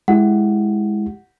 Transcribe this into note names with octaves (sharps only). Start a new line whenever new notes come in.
G#3 E4 G4 F#5